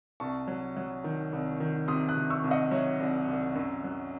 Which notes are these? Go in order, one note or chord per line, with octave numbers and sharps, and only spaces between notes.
C2 A5 C#6
F#3
F#3
D#3
C2
D#3
C3 C6 D#6
D#6 F#6
C3
C#6 E6
C2
D#5 F#5
F#3 C#5 E5
C2
C2
F#2
F#3